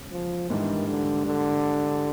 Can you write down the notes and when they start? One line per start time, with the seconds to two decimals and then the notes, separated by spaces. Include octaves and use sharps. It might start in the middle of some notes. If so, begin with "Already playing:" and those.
Already playing: E1 C#3
0.12 F3
0.50 G#2 D#3 E3 G3 A#3 D4
0.88 D3
1.26 D3